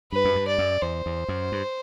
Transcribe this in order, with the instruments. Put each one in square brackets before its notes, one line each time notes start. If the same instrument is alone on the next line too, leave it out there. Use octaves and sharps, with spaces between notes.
[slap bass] G2 [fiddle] B4
[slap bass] F#2
G2
[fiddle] D5
[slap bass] F#2
[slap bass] E2 [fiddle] C5
[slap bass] E2
F#2
G2